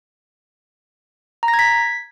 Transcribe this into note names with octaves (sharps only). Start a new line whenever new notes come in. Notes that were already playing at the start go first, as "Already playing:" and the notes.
A#5
A#6
G#6
B6